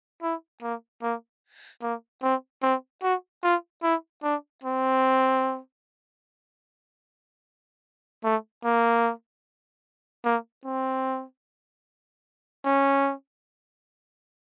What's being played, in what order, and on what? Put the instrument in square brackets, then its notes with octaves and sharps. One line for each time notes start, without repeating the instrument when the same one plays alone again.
[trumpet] E4
A#3
A#3
A#3
C4
C4
F#4
F4
E4
D4
C4
A3
A#3
A#3
C4
C#4